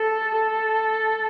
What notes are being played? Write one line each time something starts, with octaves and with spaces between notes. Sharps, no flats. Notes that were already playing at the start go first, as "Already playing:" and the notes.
Already playing: A4
A4